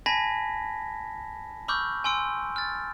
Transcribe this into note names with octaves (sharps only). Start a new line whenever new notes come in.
G#5 A5 B5 G#6 A#6 B6
B5 C#6 D6 E6 F6 G6
G#5 C6 E6 D7
F6 A6